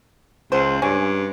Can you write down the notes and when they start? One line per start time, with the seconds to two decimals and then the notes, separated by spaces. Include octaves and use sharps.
0.52 C#2 C5
0.82 G2 C#4